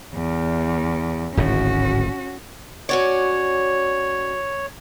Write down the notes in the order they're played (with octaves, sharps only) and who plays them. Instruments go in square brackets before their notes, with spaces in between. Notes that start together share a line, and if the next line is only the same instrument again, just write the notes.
[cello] E2
[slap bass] D1 G#1 A2 [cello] C#4 F#4
[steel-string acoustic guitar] C#4 F#4 D5 [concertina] C#5